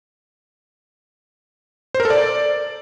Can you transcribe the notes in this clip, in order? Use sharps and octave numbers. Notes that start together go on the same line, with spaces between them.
C5
A#4
A4
D5